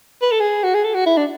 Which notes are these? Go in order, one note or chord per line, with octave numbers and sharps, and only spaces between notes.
B4
A4
G#4
F#4
G#4
A4
F#4
E4
D4